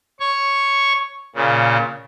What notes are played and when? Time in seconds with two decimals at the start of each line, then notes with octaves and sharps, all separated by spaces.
0.20 C#5 C#6
1.35 A#2 C#3